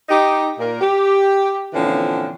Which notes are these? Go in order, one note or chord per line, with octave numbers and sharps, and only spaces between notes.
D#4 G4
A#2 A#4
G4
A#2 D3 E3 F3 C4 C#4